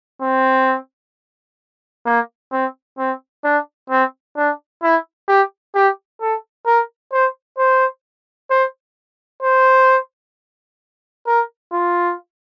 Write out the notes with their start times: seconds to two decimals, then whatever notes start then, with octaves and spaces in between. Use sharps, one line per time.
0.22 C4
2.06 A#3
2.52 C4
2.98 C4
3.44 D4
3.90 C4
4.37 D4
4.83 E4
5.28 G4
5.75 G4
6.21 A4
6.66 A#4
7.13 C5
7.58 C5
8.50 C5
9.42 C5
11.27 A#4
11.73 F4